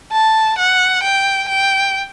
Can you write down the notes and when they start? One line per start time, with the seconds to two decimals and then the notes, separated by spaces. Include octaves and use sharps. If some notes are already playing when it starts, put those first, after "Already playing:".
0.12 A5
0.58 F#5
1.03 G5
1.49 G5